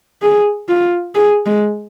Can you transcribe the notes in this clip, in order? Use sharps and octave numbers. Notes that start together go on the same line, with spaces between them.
G#4
F4
G#4
G#3